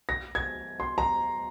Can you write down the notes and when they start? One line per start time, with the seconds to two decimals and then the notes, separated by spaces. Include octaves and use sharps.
0.09 A#6
0.35 G#6
0.80 C6
0.98 A#5